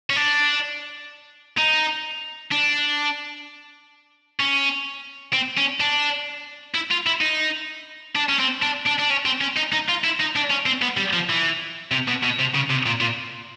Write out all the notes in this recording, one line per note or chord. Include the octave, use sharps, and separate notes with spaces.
C#4
D4
D#4
D4
C#4
C4
C#4
D4
E4
F4
E4
D#4
D4
C#4
C4
D4
D4
D4
C#4
C4
C#4
D#4
D#4
F4
E4
D#4
D4
C#4
C4
B3
G3
F3
E3
C3
B2
B2
C3
C#3
C3
A#2
A#2